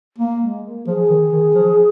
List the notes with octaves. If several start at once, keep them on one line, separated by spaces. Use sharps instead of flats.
A#3
G#3
A#3
F3 G#4
D#3
D#3
F3